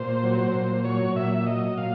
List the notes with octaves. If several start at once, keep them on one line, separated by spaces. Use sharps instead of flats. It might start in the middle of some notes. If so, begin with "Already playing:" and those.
Already playing: A#2 C5
F#3
C5
A#2
F#3 C#5
A#2 E5
F#3 D#5
A#2 F5